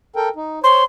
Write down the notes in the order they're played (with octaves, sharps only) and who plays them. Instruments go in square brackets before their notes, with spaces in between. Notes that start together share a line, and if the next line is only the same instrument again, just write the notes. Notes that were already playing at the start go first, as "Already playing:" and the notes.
[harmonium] A4 A#4 G5
D#4
[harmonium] C5 C#5 [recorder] C6